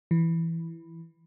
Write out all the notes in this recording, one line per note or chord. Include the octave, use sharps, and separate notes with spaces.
E3